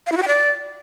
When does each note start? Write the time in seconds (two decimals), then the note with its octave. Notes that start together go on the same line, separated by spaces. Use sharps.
0.07 F5
0.12 E4
0.17 F#4
0.22 G5
0.28 D5